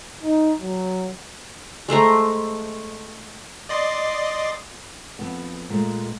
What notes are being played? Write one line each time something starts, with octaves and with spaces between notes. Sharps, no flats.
D#4
F#3
G#3 A3 C5 A#5
D5 D#5 C6
F2 B3 A5
A#2 G#3 A3